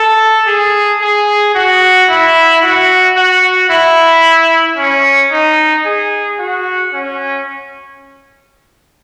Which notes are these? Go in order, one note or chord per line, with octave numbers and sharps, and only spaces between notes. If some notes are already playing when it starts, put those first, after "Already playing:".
Already playing: A4
G#4
G#4
F#4
E4
F#4
F#4
E4
C#4
D#4
G#4
F#4
C#4